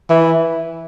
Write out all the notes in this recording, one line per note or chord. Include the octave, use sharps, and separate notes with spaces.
E3